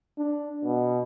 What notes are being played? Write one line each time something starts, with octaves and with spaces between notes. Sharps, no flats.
D4
B2